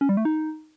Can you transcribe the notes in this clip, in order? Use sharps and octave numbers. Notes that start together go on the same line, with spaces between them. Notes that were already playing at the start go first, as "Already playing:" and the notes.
C#4
G3
A3
D#4